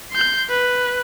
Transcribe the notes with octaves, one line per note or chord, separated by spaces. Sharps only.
C6 G6
B4